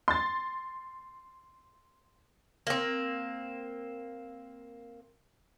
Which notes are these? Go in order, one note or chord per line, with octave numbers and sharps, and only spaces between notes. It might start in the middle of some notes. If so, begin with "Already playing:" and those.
C6 A6
A#3 C4